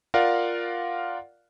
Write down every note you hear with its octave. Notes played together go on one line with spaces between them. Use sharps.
F4 A#4 D5 F5 F#5